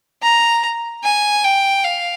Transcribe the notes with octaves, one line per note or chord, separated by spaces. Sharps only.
A#5
G#5
G5
F5